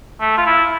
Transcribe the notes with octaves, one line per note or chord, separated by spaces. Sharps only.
A3
F4
E4